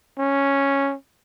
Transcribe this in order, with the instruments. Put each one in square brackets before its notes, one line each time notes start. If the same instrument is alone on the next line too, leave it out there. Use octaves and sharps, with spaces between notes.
[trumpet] C#4